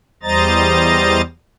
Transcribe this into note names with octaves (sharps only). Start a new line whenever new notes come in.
E2 G3 C5 D#5 A#5 A6